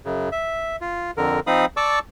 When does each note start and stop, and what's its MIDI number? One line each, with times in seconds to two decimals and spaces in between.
0.05 0.29 42
0.05 0.29 49
0.32 0.76 76
0.81 1.11 65
1.17 1.40 41
1.17 1.40 50
1.17 1.40 70
1.47 1.66 53
1.47 1.66 60
1.47 1.66 63
1.47 1.66 77
1.47 1.66 83
1.47 1.66 87
1.77 1.99 74
1.77 1.99 81
1.77 1.99 85
1.77 1.99 86
1.77 1.99 88